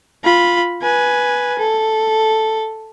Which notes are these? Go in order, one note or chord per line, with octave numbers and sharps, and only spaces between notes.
F4 B5
B4 G#5
A4